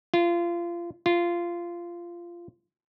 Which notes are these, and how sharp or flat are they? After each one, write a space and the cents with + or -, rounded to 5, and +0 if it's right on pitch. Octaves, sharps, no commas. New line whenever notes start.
F4 -25
F4 -15